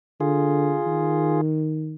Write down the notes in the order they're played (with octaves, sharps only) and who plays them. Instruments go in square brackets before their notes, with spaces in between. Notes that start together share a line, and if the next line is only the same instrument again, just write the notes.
[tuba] D3 [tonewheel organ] F4 G#4
[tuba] D#3